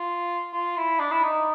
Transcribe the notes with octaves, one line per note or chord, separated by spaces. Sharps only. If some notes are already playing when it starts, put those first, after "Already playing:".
Already playing: F4
F4
E4
D4
E4
D#4